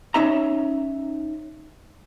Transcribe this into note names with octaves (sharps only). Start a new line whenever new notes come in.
C#4 D#4 E5 A#5